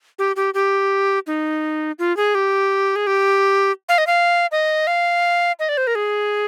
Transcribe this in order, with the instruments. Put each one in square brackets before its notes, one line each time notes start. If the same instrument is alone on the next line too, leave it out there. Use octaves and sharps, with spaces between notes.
[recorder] G4
G4
G4
D#4
F4
G#4
G4
G#4
G4
F5
D#5
F5
D#5
F5
D#5
D5
C5
A#4
G#4